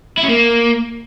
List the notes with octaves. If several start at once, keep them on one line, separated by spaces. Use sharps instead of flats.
E4
C#4
A#3